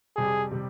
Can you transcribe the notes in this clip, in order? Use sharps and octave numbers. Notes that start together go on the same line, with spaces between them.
F2 C3 G3 G#4
C3 G3